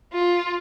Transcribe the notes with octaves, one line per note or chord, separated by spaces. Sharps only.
F4